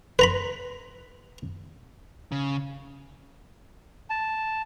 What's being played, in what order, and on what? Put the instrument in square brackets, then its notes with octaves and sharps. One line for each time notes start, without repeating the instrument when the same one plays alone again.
[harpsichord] B4 A#5 B5
[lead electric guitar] C#3
[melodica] A5